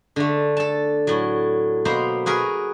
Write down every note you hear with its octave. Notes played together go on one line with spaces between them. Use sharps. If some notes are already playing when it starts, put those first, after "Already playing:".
D3 A3
A4 A5
A2 F#3
B2 A#3 B3 C5 A#5 C6
F#4 G#4 A#4 B4